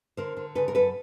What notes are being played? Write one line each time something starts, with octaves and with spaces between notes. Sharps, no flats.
D3 A#4 C5
D3
C#3 A4 B4
A#4
F#2 A4 B4